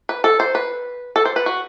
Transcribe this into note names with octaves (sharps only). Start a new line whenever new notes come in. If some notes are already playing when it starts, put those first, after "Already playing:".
B4
A4
C5
B4
A4
C5
B4
F#4